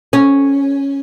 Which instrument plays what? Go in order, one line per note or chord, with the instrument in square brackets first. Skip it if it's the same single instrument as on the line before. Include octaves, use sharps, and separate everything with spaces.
[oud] C#4